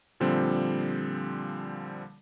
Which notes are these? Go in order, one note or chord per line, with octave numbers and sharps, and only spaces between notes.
A#2 D3 F3 G3 C4